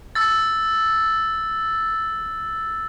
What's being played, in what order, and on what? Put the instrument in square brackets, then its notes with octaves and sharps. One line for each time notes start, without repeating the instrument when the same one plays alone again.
[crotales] E6 A6